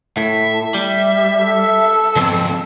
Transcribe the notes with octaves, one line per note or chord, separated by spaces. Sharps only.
A2 E5
G3
A4 E6
F2 F3 B3